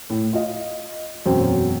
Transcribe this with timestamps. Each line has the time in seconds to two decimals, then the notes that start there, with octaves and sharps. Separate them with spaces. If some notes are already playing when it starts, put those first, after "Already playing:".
0.10 A2
0.33 F4 D#5
1.25 E1 F#2 C4 C#4 C5 G5